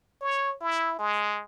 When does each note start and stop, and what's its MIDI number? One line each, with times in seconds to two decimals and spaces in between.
0.21 0.54 73
0.61 0.97 64
0.99 1.43 56